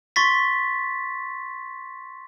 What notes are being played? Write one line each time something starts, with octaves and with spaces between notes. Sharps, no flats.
C6 C#6 A6 B6